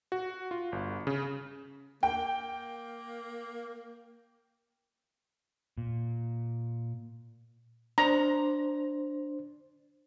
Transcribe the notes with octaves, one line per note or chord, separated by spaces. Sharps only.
F#4
F4
G1
C#3
A#3 G5
A#2
D4 C5 A#5